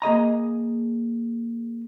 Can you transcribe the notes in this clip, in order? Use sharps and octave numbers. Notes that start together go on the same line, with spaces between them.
A#3 G#4 D#5 A#5